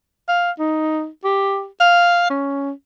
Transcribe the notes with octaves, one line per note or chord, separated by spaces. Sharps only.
F5
D#4
G4
F5
C#4